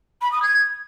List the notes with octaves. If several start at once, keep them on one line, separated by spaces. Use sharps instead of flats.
B5
D#6
G#6